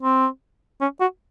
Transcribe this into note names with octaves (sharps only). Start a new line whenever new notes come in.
C4
C#4
F#4